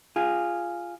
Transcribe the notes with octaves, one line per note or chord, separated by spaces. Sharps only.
F4 G#4